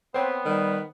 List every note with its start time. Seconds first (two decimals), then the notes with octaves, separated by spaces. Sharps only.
0.14 B3 C4 C5 C#5 G5
0.45 D#3 G3